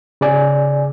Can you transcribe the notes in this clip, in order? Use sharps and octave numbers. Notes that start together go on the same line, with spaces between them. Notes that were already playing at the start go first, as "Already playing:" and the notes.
C#3 G#4 D5 G#5